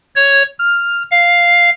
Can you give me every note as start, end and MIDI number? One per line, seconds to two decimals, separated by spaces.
0.16 0.43 73
0.59 1.03 89
1.11 1.70 77